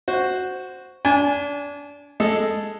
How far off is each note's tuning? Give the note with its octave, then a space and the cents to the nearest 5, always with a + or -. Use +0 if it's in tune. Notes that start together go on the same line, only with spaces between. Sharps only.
F#4 +0 C5 +0
D4 -30 G#5 +0
G#3 +0 A4 +0 D#5 +0